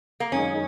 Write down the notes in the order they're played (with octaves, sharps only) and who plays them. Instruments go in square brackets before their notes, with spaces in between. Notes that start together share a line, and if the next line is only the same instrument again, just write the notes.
[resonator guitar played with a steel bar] A#3
[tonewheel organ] F#2 D#3 G#3 D#4 [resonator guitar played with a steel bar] C#4